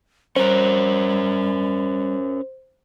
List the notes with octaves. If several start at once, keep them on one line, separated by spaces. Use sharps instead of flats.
G3 C#4 A#4 C5